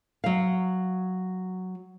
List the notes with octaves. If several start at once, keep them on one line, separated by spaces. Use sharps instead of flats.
F#3 F5